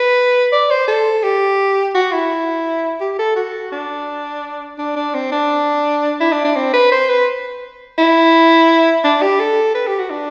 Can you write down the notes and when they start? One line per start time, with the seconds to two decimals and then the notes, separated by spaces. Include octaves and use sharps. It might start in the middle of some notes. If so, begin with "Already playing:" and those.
Already playing: B4
0.53 D5
0.70 C5
0.88 A4
1.23 G4
1.95 F#4
2.12 E4
3.01 G4
3.19 A4
3.36 F#4
3.72 D4
4.78 D4
4.96 D4
5.14 C4
5.32 D4
6.21 E4
6.33 D4
6.45 D4
6.56 C4
6.74 B4
6.92 C5
7.09 B4
7.98 E4
9.04 D4
9.22 G4
9.40 A4
9.75 B4
9.87 G4
9.99 F#4
10.10 D4